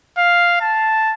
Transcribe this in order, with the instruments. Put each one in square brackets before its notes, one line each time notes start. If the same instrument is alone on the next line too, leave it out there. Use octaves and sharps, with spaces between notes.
[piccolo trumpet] F5
A5